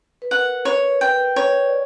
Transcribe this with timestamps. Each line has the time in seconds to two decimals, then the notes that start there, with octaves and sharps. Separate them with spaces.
0.22 B4
0.31 A#4 F#5
0.65 C#5
1.01 B4 G5
1.36 C#5
1.66 D5